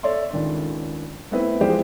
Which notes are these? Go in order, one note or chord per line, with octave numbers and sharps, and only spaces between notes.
A4 C#5 D5 E5 C6
C#2 D#3 D4 D5
A3 B3 C4 E4 B4
E3 F3 G#3 G4 C5